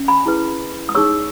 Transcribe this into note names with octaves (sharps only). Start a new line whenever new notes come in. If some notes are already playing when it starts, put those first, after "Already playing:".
Already playing: C#4
G#5 B5
E4 G#4 B4
D#6
D#4 G#4 C#5 C#6 E6